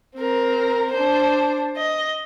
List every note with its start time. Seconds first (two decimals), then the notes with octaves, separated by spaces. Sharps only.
0.16 C4 A#4
0.93 D4 C5
1.77 D#5